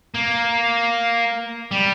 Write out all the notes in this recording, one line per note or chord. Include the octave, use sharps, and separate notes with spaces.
A#3
G3